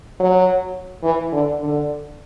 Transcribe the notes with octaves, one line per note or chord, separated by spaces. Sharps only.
F#3
E3
D3
D3